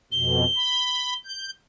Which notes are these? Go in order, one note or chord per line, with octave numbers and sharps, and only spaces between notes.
F2 B2 G7
B5
G6